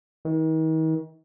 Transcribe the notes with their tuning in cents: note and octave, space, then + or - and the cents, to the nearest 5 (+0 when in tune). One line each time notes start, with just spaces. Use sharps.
D#3 +40